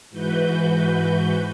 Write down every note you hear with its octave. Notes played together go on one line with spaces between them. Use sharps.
G#2 E3 F#4 B4 G6